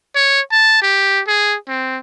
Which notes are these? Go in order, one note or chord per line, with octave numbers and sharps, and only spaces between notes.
C#5
A5
G4
G#4
C4